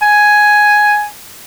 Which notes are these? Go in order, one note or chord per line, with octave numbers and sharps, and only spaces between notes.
G#5